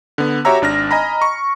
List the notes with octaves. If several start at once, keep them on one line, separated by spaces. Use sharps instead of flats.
D3 B3
F#4 G4 C#5 E5 A#5 E6
G#1 D4 F6 A#6
D#5 G#5 A#5 B5
C#6